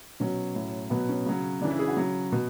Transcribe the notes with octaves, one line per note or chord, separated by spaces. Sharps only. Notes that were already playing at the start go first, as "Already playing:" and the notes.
B2 F#3 C#4
A2 F#3
B2 F#3 B3
C#4
C#3 F#3
C#3 E3 D4
E4
G#4
F#4
C#3 F#3
B2